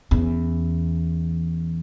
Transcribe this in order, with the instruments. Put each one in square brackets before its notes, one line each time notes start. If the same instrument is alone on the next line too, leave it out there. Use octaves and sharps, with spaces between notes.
[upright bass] E2 C#4